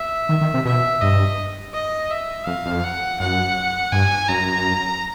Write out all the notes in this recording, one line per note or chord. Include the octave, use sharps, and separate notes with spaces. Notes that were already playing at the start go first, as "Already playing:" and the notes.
Already playing: E5
D#3
D#3
C3
B2 E5
G2 D#5
D#5
E5
F2 F5
F2
F#5
F#2 F#5
G2 G#5
F#2 A#5